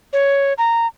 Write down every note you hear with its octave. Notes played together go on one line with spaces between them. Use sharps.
C#5
A#5